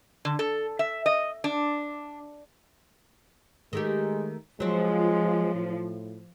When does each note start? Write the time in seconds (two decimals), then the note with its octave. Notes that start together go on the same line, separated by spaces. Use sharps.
0.25 D3
0.39 A4
0.79 E5
1.06 D#5
1.44 D4
3.73 D#3 G#3 A3 G4
4.60 F3 F#3 G#3 C4
5.55 A2